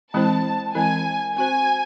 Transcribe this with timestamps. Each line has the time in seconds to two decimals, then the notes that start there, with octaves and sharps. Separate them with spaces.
0.14 E3 G#3 C4 E4 C5 A5
0.75 E3 G#3 C4 E4 C5 G#5
1.36 C4 F#4 C5 G#5